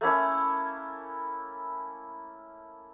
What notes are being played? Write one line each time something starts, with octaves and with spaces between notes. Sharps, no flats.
A3 A#3 C#4 E4